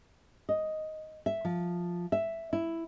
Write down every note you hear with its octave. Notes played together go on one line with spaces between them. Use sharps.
D#5
E5
F3
E5
E4